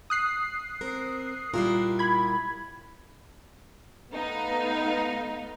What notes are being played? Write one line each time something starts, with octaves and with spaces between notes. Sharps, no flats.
D#6 F#6 C7
C4 A#4
A#2 G3 E4 A#4
B5 G#6
A3 B3 D#4 F5